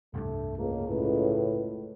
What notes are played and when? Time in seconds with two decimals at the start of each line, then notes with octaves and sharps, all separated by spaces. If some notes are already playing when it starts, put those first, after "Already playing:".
0.14 F1 C2 G2 A3
0.57 C#2 A#3
0.88 A2 B4